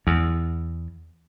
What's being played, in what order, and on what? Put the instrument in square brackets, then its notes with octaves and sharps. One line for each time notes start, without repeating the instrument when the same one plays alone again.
[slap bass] E2